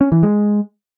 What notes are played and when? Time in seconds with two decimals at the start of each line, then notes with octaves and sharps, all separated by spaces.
0.01 C#4
0.12 E3
0.23 G#3